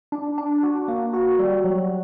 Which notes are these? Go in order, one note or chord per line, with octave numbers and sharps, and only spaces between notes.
D4
D4
F#4
A#3
F#4
G3
F#3